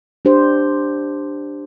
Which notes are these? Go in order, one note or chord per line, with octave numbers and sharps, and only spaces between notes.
D4 G4 C5